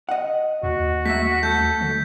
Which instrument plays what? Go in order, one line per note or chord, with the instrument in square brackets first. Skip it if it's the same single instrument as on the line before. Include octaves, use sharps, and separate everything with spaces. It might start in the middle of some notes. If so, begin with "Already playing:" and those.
[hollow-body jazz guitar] D#5 F#5
[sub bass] D#2 [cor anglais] F#4
[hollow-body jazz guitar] A3 A#3 E5 [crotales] B6
[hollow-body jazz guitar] A3 [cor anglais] A4 [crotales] G6
[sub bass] D3